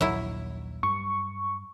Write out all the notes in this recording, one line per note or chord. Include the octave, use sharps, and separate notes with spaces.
A#1 D#2 F#3 E4
G2 C#6